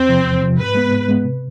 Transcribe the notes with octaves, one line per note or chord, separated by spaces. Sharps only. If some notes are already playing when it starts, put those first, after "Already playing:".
Already playing: E2 C4
C3 F3
E2
C3 F3
G#2 B4
G#3 B3
G#2
G#3 B3
C3